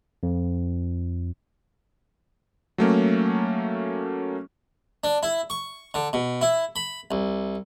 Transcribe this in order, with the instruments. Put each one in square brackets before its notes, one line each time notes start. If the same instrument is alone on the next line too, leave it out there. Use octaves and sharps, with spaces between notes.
[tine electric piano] F2
[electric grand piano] F#3 A3 A#3 C#4
[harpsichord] D4
E4
C#6
D3
B2
E4
B5
C2